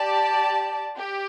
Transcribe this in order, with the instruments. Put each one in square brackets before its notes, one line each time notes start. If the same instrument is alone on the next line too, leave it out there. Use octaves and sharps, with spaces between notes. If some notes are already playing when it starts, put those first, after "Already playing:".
Already playing: [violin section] G4 D5 A5
G4